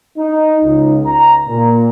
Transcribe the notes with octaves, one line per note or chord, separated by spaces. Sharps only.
D#4
C#2
A#5
A#2